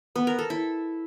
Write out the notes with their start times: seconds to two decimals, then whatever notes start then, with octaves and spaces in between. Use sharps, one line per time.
0.16 B3
0.27 A#4
0.39 A4
0.50 E4